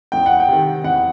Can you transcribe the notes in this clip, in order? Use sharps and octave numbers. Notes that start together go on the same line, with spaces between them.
E2 G5
F#5
G5
C3 D#3
E2 F#5